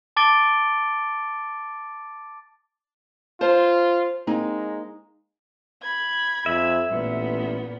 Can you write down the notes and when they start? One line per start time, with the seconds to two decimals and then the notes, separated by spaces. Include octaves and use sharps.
0.16 A5 D6 A6 D7 G7
3.41 F4 C5 A5
4.27 G#3 A#3 C4 D#4
5.82 B5 G#6
6.46 F2 E5
6.90 A1 A#2 B3